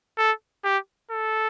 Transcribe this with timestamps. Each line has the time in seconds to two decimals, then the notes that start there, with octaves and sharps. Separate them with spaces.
0.18 A4
0.64 G4
1.10 A4